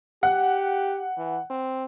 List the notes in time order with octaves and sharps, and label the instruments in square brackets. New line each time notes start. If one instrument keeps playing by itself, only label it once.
[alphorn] G4 [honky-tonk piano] F#5
[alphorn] E3
C4